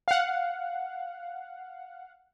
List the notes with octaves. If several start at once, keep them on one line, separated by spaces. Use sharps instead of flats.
F5 F#5